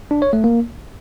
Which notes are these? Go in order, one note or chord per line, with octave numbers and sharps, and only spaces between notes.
D4
C#5
A3
A#3